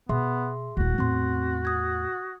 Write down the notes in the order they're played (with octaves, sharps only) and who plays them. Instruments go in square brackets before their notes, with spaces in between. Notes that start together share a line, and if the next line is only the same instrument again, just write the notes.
[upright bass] B2 [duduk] B3 [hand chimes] G#4 E5 C6
[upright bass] D#1 E4 [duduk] F#4
[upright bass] E2 A2 [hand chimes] C4 C6
[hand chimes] D#6 G#6